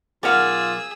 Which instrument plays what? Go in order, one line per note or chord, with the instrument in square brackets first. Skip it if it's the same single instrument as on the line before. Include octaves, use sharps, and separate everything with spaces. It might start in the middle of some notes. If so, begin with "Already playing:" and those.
[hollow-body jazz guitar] B1 A#4 F#5 [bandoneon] F4 [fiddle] G#4 E6 [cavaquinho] D5 F5